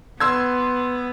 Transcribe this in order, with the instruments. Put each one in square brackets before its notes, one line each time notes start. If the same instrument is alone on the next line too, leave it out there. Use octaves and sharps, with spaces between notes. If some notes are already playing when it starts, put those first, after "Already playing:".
[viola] B3 [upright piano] C6 E6 G#6